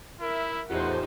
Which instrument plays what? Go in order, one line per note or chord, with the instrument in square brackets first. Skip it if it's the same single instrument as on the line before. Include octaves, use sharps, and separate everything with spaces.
[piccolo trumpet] E4 [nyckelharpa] A#4 E5
[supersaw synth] E2 A2 C5 [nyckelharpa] D#4 [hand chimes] F4 G4 [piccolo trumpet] F#5